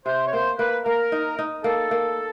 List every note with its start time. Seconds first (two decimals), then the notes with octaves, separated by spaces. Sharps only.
0.06 C3 C5
0.27 C#5
0.32 A#3 C5
0.59 A#3 B4
0.85 A#3 A#4
1.12 D#4
1.39 D#4
1.64 A#3 A4
1.91 A#3